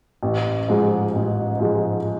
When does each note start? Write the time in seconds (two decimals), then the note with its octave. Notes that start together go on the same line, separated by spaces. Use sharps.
0.23 A1
0.68 G#2 F3 G#3
1.14 A1
1.60 G#2 F3 G#3